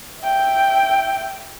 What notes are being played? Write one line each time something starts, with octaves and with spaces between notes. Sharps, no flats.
E5 G5